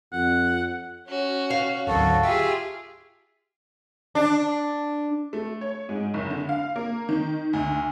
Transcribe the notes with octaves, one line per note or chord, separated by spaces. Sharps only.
F2 F#5
C#4 F#4
F5
G#1 D2 F#3 F#4 A4
F4 G4 G#4 E5
D4
A3
C#5
G#2
F#1
D3
F5
A#3
D#3
D2